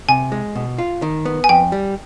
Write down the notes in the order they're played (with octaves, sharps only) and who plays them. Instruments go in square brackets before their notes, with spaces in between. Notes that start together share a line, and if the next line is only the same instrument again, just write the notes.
[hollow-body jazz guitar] C3 [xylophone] G#5
[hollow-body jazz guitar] G#3
B2
F4
D#3
B3
[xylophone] G#5
[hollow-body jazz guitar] F2 [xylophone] G5
[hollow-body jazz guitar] G3